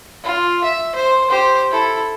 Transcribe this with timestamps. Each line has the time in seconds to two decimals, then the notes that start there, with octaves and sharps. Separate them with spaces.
0.23 F4
0.64 E5
0.95 C5
1.30 G4 C5
1.71 E4 A4